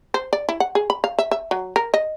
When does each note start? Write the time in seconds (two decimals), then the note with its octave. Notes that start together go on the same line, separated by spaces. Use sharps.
0.14 C5
0.33 D5
0.49 E4
0.60 F#5
0.75 G#4
0.90 B5
1.04 F5
1.19 E5
1.31 E5
1.51 F#3
1.76 A#4
1.94 D#5